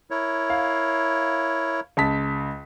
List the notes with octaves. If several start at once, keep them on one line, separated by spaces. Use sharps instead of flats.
E4 A#4 C#5
F5
C#2 A5 B6